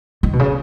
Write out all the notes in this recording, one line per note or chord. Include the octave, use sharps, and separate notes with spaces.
D#3
B2
C#3